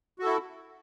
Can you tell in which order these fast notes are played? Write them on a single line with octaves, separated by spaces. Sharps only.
F#4 A4 E4